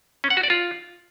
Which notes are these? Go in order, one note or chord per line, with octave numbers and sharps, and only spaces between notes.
C#4
F#5
F#4
D5
F4